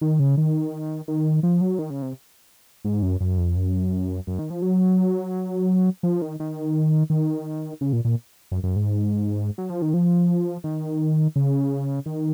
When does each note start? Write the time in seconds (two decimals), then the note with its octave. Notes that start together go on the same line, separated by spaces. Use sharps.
0.01 D#3
0.19 C#3
0.37 D#3
1.08 D#3
1.43 F3
1.61 F#3
1.79 D#3
1.90 C#3
2.02 C3
2.85 G#2
3.02 F#2
3.21 F#2
3.38 F2
3.56 F#2
4.27 F#2
4.39 D#3
4.50 F3
4.62 F#3
6.03 F3
6.22 D#3
6.40 D#3
7.10 D#3
7.81 C#3
7.93 A#2
8.05 A#2
8.52 F#2
8.63 F#2
8.76 G#2
9.58 F#3
9.70 F3
9.82 D#3
9.94 F3
10.64 D#3
11.36 C#3
12.06 D#3